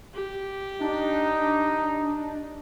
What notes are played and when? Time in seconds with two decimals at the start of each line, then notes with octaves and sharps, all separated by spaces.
0.14 G4
0.81 D4 D#4